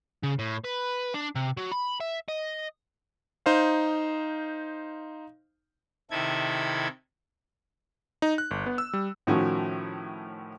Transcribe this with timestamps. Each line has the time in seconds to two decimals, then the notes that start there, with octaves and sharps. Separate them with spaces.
0.23 C#3
0.39 A2
0.64 B4
1.14 D4
1.36 C3
1.57 F#3
1.72 B5
2.00 E5
2.28 D#5
3.46 D#4 C5 F5
6.11 C3 D#3 E4 A4 G#6
8.22 D#4
8.38 F#6
8.51 G1
8.66 B3
8.78 E6
8.93 G3
9.27 A2 D#3 F3 C#4 F#4